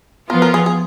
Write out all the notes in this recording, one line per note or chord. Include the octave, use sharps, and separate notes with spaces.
F3 B3 F4 A#4
A#4
G#4
G#4